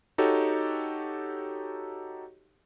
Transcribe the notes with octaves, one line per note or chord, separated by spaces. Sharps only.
D#4 F#4 G4 A4 C#5